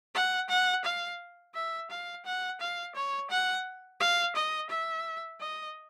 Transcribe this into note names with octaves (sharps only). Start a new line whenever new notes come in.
F#5
F#5
F5
E5
F5
F#5
F5
C#5
F#5
F5
D#5
E5
D#5